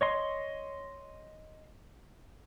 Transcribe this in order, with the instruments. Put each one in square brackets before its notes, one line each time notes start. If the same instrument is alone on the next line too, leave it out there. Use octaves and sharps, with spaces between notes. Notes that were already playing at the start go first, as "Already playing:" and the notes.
[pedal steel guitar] C#5 D#5 C6